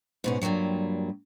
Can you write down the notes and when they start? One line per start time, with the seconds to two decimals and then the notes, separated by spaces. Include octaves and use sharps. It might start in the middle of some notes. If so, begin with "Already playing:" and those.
0.24 G#2 B2 C#4
0.42 G2 A#2 D#3 F#3 G3